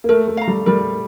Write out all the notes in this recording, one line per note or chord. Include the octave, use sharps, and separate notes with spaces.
A#3
A3 A#4
A3
F5 A#5
G3
G3 A#4